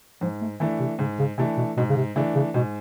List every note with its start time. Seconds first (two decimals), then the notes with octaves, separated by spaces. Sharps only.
0.21 G#2 F3
0.41 A3
0.60 D#3 E3 A3 D4
0.80 C3
0.99 G#2 C#3
1.19 C#3
1.38 C3 E3 A3 D4
1.57 B2
1.77 G#2 B2
1.90 C#3
1.97 C3
2.16 C#3 E3 A3 D4
2.35 C#3
2.54 G#2 B2